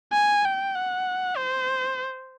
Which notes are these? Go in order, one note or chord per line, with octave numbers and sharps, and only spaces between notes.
G#5
G5
F#5
C5